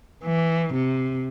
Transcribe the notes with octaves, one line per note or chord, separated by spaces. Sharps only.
E3
C3